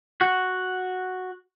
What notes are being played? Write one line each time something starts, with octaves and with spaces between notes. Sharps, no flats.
F#4